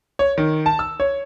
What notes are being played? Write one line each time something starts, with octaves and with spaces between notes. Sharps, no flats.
C#5
D#3
A5
E6
C#5